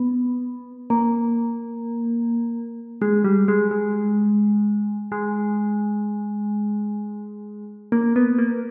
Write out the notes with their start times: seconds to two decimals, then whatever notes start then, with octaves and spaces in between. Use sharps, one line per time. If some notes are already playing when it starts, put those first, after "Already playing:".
Already playing: B3
0.90 A#3
3.02 G#3
3.24 G3
3.48 G#3
3.71 G#3
5.12 G#3
7.92 A#3
8.16 B3
8.38 A#3